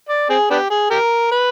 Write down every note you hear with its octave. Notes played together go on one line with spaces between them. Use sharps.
D5
C4 G#4
B3 D4 G4
G#4
G4 A#4
B4